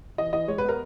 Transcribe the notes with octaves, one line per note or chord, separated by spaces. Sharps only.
E3 D#5
E3 D#5
G#3 C#5
B3 B4
A#4